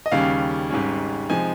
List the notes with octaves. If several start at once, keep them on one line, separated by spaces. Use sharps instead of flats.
D#5
D#2 C#3 G3 C#4 F5
G#1 G#2 G3 C#4
C3 F3 G#3 D#4 G#5